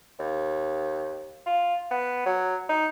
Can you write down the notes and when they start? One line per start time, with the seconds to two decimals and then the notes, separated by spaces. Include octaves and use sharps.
0.19 D#2
1.46 F4
1.91 B3
2.26 F#3
2.69 D#4